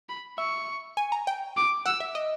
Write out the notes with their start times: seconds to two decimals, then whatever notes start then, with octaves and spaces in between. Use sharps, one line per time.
0.09 B5
0.38 E5 C#6
0.97 G#5
1.12 A#5
1.27 G5
1.57 D6
1.86 F#5 E6
2.00 E5
2.15 D#5